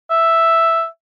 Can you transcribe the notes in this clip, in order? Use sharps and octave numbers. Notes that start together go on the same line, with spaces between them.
E5